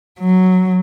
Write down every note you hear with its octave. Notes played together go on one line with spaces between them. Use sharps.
F#3